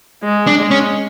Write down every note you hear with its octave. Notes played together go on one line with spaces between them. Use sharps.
G#3
D4
G#3
C#4